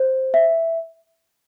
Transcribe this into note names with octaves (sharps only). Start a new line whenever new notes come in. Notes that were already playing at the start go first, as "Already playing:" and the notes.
Already playing: C5
E5